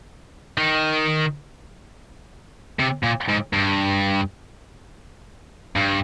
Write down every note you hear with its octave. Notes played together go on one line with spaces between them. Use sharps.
D#3
C3
A#2
G#2
G2
G2